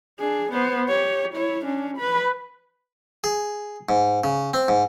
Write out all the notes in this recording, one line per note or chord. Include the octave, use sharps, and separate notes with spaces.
D4 G#4
B3 C5
G4 C#5
E4 C#5
C#4 D4
B4 B5
G#4
G#2
C#3
C4
G#2